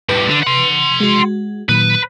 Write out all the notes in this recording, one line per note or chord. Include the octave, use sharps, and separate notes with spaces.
A2 G3 B4
D3
F#5 C6
G#3 F#4
A#2 D#3 F#3 B4